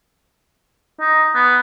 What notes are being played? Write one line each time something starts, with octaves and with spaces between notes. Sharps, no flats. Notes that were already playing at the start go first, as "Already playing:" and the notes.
D#4
B3